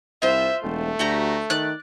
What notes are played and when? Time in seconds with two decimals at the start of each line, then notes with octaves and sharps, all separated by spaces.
0.22 C2 F4 C5 E5
0.64 E1 A3
0.99 D2 F#4 G4 A#5
1.50 D#3 D5 F#6